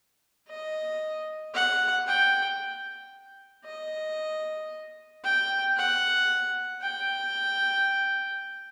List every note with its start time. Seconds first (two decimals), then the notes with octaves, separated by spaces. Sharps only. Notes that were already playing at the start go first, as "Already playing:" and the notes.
0.48 D#5
1.54 F#5
2.07 G5
3.65 D#5
5.24 G5
5.76 F#5
6.81 G5